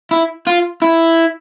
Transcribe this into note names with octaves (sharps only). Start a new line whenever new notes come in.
E4
F4
E4